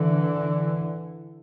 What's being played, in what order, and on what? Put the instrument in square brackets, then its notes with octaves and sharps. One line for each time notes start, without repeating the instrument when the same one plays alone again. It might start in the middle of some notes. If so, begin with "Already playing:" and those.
Already playing: [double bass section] D3 E3